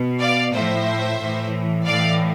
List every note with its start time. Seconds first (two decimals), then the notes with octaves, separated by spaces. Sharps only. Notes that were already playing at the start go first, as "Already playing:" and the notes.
Already playing: B2
0.21 D5 F5
0.53 A2 F3 C5 E5
1.20 A2 E3
1.86 A2 E3 D5 F5